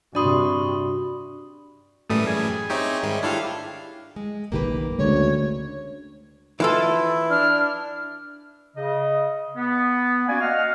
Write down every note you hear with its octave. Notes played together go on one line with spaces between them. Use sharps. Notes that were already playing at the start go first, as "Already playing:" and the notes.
G2 C3 D4 F#4 D5 B5 C6 D#6
F#2 A2 E3 G3 A3 D#6
G#4
C4 D#4 G4 C#5 E5
G#2 D#3 G3
D4 E4 F4 G4 A4 F5
G#3
F#1 B1 D#3 A#3 G4 B4
D2 C#3 G#3 C#5
E3 E4 F4 A4
D4 F6
C#3 D#5
B3
A#3 C#4 F#4 D5 G#5
D#5 F5 F#5 F6